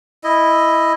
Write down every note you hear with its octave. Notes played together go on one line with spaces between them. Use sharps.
E4 D#5